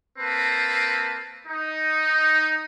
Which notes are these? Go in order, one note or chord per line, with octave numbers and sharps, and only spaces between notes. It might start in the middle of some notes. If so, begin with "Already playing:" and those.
A#3 C4 B4 A5
D#4